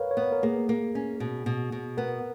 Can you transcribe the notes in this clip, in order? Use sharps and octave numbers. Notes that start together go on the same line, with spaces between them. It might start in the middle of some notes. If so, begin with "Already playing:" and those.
Already playing: A#4 B4 C#5 F5
C#5
B3
B4
A#4
A#3 G#4
A#3
C#4
B2
B2
B2
B3 A#4